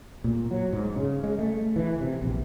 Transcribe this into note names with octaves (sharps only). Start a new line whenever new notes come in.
A#2
F#3
G#2
C#3
G#3
A3
E3
C3
A#1